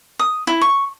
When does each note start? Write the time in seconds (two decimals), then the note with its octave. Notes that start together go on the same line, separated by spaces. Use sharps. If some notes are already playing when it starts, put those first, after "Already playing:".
0.19 D#6
0.47 E4
0.61 C#6